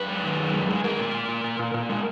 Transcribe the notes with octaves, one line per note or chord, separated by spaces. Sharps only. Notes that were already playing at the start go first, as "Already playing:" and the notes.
Already playing: F#2 B4
G#3
D#3
F#2
G#3
G#3
G#3 A#4
A#2
A#2
A#2
A#2
A#2
A#2
G#3